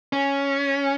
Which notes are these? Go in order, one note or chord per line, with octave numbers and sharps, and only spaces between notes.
C#4